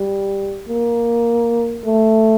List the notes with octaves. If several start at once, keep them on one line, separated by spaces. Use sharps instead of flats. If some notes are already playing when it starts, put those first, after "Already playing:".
Already playing: G3
A#3
A3